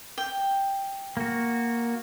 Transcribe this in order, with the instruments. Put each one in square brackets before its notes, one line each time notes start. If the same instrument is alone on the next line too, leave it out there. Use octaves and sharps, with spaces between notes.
[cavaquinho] G5
[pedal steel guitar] A#3 F#4